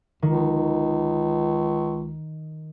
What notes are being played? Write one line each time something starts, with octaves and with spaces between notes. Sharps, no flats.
C#2 D#3